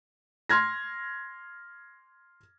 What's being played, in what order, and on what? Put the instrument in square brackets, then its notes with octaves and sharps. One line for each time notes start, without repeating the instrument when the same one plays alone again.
[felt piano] C6 F6 G#6 A#6